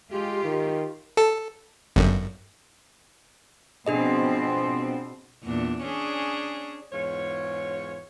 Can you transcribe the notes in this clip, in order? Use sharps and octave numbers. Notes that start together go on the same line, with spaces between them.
G#3 F4 G4
D#3
A4
G1 F#2
B2 F3 C4 D4 G#4 D#5
E2 A#2 D4
C#4 D4 G#4
E2 G#2 F4 C#5